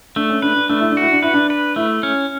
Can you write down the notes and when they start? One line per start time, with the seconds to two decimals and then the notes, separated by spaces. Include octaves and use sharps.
0.16 A3 D4
0.30 C#4
0.42 D4 B4
0.56 D4
0.69 A3 D4
0.81 E4
0.91 D4
0.97 F#4
1.02 E4
1.12 D4
1.23 E4 B4
1.34 D4
1.50 B4
1.76 A3 E4
2.03 C#4